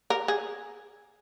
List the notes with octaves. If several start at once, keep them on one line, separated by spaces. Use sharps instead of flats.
A#4
G#4